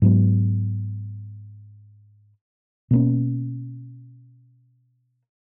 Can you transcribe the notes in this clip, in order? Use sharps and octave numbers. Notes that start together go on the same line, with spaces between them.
G#2 F#3 B3
B2 A#3 C#4